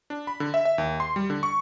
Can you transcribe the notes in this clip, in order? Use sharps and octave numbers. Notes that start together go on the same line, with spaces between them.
D4
B5
D3
E5
E5
D#2
C6
G3
D3
C#6